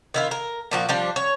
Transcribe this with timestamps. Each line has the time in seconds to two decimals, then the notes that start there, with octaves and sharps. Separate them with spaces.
0.14 D#3 E4 F4
0.31 A#4
0.71 A#2 F3 F#4
0.89 F3 G3 D4
1.16 C#5